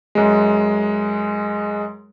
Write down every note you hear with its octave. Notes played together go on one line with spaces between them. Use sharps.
F#2 G#3